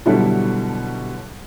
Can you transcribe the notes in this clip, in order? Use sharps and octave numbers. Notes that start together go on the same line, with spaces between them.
B2 D3 F#3 G3 E4 A4